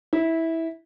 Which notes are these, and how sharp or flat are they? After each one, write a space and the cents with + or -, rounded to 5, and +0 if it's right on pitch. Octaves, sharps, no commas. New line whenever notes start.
E4 -15